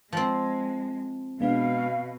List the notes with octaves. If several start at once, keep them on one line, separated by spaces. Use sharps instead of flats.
F3 G#3 C4
B2 G#3 B3 D4 F5